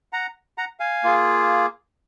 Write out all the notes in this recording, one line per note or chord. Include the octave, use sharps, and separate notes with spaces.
F#5 A#5
F#5 A#5
F5 G#5
A#3 F4 G#4